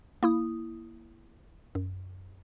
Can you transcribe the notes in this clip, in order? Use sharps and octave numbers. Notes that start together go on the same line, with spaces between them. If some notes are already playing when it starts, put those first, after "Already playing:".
A#3 E4 D#6
F#2